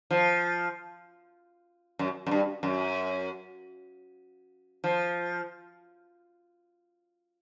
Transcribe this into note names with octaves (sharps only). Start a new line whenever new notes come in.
F3
F#2
F#2
G2
F#2
F3